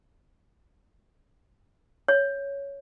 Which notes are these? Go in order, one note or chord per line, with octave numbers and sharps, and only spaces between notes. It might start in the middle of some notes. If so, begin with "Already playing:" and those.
C#5